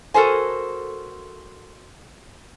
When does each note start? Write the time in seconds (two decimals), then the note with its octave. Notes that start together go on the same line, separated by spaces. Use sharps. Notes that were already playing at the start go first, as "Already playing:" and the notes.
0.14 F#4 A4 A#4 C5 G#5